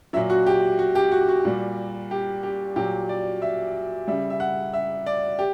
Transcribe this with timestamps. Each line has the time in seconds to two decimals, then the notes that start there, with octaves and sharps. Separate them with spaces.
0.13 F#3 E5
0.16 A#2
0.30 F#4
0.46 G4
0.79 F#4
0.95 G4
1.12 F#4
1.28 F#4
1.45 A#2 G3
2.11 G4
2.43 G4
2.76 A#2 F#3 G4
3.09 D5
3.42 E5
4.08 C#3 G3 E5
4.30 E5
4.40 F#5
4.73 E5
5.06 D5
5.39 G4